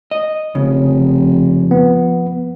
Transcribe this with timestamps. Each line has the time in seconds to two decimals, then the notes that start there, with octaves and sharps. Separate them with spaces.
0.11 D#5
0.55 F1 C#3
0.93 F3
1.71 B3